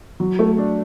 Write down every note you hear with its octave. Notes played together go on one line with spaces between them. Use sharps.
F#3
A3
D4